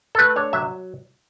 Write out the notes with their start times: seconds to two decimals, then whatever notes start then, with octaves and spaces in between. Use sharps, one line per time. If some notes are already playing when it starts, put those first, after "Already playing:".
0.15 A4
0.19 A3 B4
0.36 D4 C#5
0.53 F#3 E5